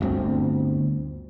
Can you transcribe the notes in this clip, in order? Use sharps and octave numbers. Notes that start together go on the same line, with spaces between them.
G1 D2 C4